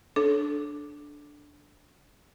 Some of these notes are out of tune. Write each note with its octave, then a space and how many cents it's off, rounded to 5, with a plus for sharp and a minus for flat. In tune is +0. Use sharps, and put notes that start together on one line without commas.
D4 +0 A4 -20 C#5 +0